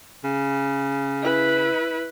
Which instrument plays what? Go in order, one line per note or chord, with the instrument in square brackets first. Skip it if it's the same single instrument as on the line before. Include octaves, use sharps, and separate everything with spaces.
[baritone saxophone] C#3
[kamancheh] E4 B4